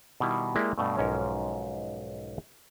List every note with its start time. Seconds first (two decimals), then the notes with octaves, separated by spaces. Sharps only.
0.20 B2 D#3 G3 E4
0.55 G#3 A#3 E4 G4 D5 E5
0.78 G2 B2 A3
0.97 B1 G#2 F3 C#4 A#4 C#5